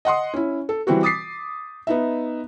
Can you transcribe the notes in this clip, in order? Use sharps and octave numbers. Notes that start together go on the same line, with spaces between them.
D#5 F#5 C6 D#6
C#4 E4
A4
E3 G3 C4 E4 F#4
D6 D#6 A6 B6 C7
B3 D#4 E5